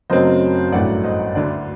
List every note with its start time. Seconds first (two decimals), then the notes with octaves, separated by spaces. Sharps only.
0.10 F#1 F#2 F#3 A3 C4 C5 D#5
0.72 A1 G2 F#3 A3 D5 F#5
1.04 C5 D#5
1.35 D2 D3 A3 D5